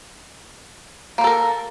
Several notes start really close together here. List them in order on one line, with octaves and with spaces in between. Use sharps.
A#3 C5 A4 A#4